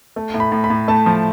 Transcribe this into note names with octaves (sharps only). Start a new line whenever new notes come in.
A3
A2
B5
A2
B5
A2
A3 A5
F3